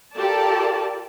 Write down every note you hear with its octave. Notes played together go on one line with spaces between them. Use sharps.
F4 G4 A4 A#4 D5 A5